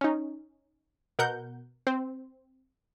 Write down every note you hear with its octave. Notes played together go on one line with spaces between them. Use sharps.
C#4 D#4
B2 A#4 F#5 G6
C4 C5